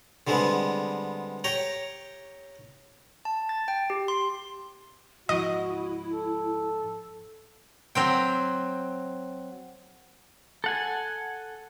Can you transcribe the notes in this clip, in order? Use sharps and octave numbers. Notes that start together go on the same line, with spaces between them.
D3 G3 G#3 B3 C4
G4 C#5 G5 A#5
A5
A6
G5
G4
C6
G#2 F3 G#3 E4 F#4 D#5
A4
F#3 C4 G5
A4 F#5 G#5